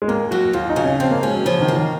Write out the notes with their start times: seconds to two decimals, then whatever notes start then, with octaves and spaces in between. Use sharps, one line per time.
0.02 G#3
0.08 D#2 A#3
0.31 F#3 F#4
0.53 D#2 F4
0.70 D#4
0.76 C#3
0.84 C#4
1.00 F3 C4
1.11 A#3
1.23 G#3 C#4
1.34 F#3
1.45 C#3 F3
1.61 D#3
1.68 A#3
1.76 D#3